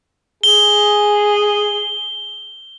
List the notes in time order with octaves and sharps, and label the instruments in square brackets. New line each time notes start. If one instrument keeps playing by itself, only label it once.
[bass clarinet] G#4 [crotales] G7